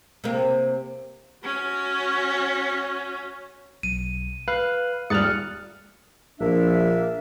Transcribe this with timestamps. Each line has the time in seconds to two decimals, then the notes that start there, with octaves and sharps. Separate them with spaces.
0.24 C3 A#3
1.44 C#4 F#4
3.83 B1 D#7
4.48 B4 F5 F#6
5.10 D#1 G3 D#6 F6 F#6 A6 C#7 F7
6.40 A#1 A#3 D4 E5